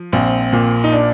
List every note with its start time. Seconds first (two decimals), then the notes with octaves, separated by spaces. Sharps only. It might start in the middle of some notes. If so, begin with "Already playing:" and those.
Already playing: F3
0.12 A#1 C4
0.53 A#2
0.84 D#4
0.92 D4